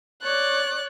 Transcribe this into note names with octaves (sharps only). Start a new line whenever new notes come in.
C#5 D5 F#6